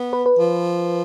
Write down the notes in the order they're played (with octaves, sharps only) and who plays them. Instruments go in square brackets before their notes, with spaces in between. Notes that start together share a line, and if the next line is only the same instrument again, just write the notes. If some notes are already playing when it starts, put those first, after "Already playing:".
Already playing: [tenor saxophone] B3
[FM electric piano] B4
B4
[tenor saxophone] F3